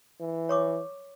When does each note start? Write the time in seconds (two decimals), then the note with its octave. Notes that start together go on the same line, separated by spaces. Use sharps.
0.20 E3
0.49 C#5 C#6 D6